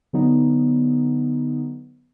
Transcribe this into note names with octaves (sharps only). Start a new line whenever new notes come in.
D3 F#3 B3 D#4